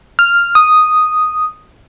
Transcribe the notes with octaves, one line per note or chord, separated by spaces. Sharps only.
F6
D#6